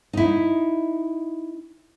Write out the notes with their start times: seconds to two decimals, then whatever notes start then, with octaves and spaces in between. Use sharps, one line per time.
0.13 D#4 E4